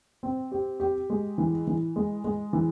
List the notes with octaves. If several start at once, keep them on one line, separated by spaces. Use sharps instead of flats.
C4
G4
G4
G#3
E3
E3
G#3
G#3
E3